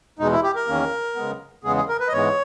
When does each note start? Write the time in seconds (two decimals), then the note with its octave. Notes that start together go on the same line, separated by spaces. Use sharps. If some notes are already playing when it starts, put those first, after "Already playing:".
0.19 E2 B2 G#3 D#4
0.32 E4
0.43 G4
0.55 A#4
0.68 E2 D#3 A#3 C#4
1.15 C#3 G#3 B3
1.64 E2 C#3 G#3 B3 G#4
1.76 G#4
1.89 A#4
2.00 B4
2.08 D#5
2.12 G#2 E3 G#3 B3 C#5